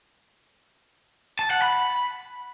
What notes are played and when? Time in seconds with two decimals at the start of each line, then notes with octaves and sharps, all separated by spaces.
1.39 A5
1.51 F#5
1.62 B5